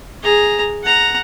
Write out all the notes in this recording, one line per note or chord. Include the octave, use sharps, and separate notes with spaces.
G#4 A#5
F#5 A#5